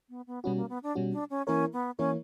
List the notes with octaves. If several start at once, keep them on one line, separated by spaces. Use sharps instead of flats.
B3
B3
B2 G3 B3 C#4 F#4
A#3
B3
D4
B2 G3 C#4 F#4
D4
C#4
E3 A#3 C#4 E4 A#4 C#5
B3
E3 A#3 C#4 E4 A#4 C#5